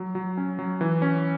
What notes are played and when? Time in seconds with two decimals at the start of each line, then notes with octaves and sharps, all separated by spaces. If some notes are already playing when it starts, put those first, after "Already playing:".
Already playing: F#3
0.15 F#3
0.37 C#4
0.59 F#3
0.81 E3
1.02 C#4